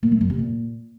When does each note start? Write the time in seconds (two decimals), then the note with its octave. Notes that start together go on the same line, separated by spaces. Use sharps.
0.03 A#2
0.12 A3
0.21 F#2
0.30 C3
0.39 A#2